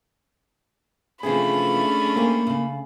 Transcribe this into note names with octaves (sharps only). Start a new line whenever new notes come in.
C3 E3 F3 A3 C#4 D4 G#4 B5
A#3 G4 G#4 C5
C#3